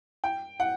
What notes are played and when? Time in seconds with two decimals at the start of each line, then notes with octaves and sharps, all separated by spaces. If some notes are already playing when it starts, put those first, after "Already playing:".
0.24 G5
0.60 F#5